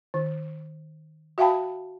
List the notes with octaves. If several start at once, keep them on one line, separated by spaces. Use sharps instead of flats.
D#3
F#4 E5 F5 G5 A5 B5